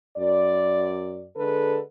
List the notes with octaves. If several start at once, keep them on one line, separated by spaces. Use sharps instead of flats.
F#2 D5
D3 G#3 A4 B4